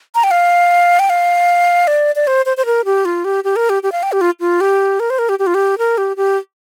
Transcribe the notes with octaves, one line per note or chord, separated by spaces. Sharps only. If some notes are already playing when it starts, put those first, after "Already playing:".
A#5
G5
F5
G5
F5
D5
D5
C5
C5
C5
A#4
G4
F4
G4
G4
A#4
G4
G4
F5
G5
G4
F4
F4
G4
A#4
C5
A#4
G4
G4
F4
G4
A#4
G4
G4